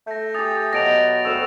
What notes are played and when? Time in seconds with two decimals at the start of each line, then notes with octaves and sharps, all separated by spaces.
0.07 A3 G6 A#6
0.35 G4 G#5 D#6 A6
0.73 B2 F#3 A#6 D7 F7
1.25 D2 C#5 F5 G5 E6 E7